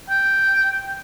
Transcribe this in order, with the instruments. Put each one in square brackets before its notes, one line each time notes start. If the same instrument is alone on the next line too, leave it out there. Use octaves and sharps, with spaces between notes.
[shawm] G5